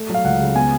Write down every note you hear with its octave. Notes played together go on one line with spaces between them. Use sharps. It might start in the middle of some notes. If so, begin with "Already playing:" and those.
Already playing: A3
F#3 F5
C#2 F#5
C#3
B3 G#5